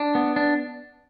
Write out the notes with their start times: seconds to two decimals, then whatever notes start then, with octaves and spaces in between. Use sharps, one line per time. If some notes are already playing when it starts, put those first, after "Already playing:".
Already playing: D4
0.15 B3
0.36 D4